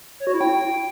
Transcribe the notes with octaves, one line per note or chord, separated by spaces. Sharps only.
C#5
F#4
E4
G5